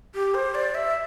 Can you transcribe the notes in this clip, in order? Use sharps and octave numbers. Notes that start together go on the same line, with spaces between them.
G4
C5
D5
E5